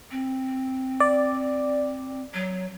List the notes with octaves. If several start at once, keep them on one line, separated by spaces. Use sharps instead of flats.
C4
D5
F#3